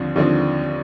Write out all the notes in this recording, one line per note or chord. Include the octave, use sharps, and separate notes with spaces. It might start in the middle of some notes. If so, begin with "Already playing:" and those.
Already playing: D#2 D3 F3 C4
D#2 D3 F3 C4